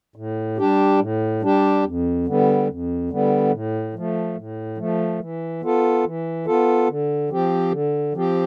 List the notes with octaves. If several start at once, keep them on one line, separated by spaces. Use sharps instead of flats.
A2
G3 D4 G4
A2
G3 D4 G4
F2
D3 G3 B3
F2
D3 G3 B3
A2
F3 A3
A2
F3 A3
E3
B3 F4 A4
E3
B3 F4 A4
D3
F3 C4 G4
D3
F3 C4 G4